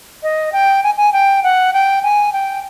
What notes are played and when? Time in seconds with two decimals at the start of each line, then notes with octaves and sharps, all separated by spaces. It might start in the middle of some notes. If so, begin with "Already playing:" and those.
0.23 D#5
0.52 G5
0.83 G#5
0.97 G#5
1.13 G5
1.43 F#5
1.73 G5
2.03 G#5
2.33 G5